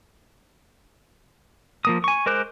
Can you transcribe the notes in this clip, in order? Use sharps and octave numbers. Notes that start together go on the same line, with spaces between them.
F3 A#3 D#6
G#5 C#6
G#3 A#4 C5 D6 F#6